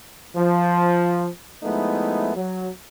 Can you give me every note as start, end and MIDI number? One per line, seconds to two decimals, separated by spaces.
0.35 1.27 53
1.63 2.31 53
1.63 2.31 56
1.63 2.31 57
1.63 2.31 59
1.63 2.31 63
1.63 2.31 64
2.36 2.68 54